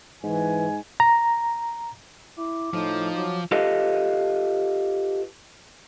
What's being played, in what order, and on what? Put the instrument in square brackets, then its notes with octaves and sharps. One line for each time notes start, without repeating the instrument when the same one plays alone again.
[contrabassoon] G#2 [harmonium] E3 [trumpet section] G#5
[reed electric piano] A#5
[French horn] E4 [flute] D6
[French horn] A2 [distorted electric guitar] F3 [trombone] D#4
[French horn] F#3 [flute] D6
[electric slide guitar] F4 G4 A4 B4 D#5 F5